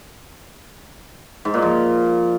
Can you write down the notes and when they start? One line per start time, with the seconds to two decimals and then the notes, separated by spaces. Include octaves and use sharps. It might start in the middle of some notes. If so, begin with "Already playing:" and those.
1.45 G#2
1.54 A#2
1.62 F3